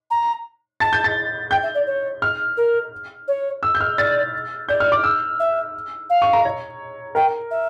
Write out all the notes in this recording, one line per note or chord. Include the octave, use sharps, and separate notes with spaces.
A#5
A5 A6
G6
A6
G5 G6
E5
D5
C#5
F6
A#4
C#5
E6
G6
F6
D5 A6
D5 G6
F6
D6
E6
E5
F5
C#6
A#5
C#5
A#4 G5
E5